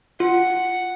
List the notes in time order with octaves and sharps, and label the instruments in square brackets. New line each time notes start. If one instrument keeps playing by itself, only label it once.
[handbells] F4 [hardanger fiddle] F#5